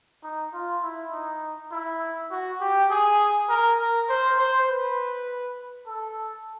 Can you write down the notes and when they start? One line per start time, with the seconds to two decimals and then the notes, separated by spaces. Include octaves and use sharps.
0.24 D#4
0.54 F4
0.83 E4
1.12 D#4
1.71 E4
2.31 F#4
2.61 G4
2.90 G#4
3.49 A#4
3.79 A#4
4.09 C5
4.38 C5
4.69 B4
5.86 A4